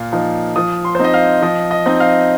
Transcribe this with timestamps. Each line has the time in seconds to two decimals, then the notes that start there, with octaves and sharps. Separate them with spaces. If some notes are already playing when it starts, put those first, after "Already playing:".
Already playing: A#2 F5
0.12 F3 D#4
0.56 F3 D#6
0.85 C6
0.95 C5
0.99 C4 D#4
1.04 D#5
1.14 F5
1.42 F3 D#5
1.71 D#5
1.86 C4 D#4
2.00 F5